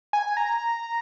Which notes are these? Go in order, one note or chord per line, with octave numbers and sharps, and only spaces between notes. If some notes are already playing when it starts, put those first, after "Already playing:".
G#5
A#5